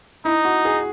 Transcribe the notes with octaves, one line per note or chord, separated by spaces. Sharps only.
D#4 E4
F#4
G#4